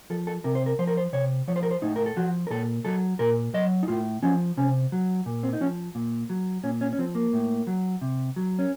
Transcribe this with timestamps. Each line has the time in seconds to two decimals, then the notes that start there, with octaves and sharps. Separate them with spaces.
0.10 F3 A4
0.27 A4
0.44 C3 A#4
0.55 C5
0.66 A#4
0.79 F3 C5
0.87 A#4
0.97 C5
1.13 C3 C#5
1.48 F3 C#5
1.56 C5
1.63 A#4
1.71 C5
1.82 A2 D#4
1.96 A#4
2.06 A4
2.17 F3 F#4
2.47 A#4
2.50 A#2 A4
2.85 F#3 A4
3.19 A#2 A#4
3.54 F#3 D#5
3.83 D#4
3.88 A2 F4
4.23 F3 C#4
4.57 C3 C#4
4.92 F#3
5.26 A#2
5.43 C4
5.53 D#4
5.61 F3 C#4
5.95 A#2
6.30 F#3
6.64 A#2 C#4
6.81 C#4
6.93 C#4
6.99 F3 C4
7.15 A#3
7.33 A2
7.67 F#3
8.01 C3
8.36 F#3
8.59 C#4